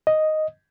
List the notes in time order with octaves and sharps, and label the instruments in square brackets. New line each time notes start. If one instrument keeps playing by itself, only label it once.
[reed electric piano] D#5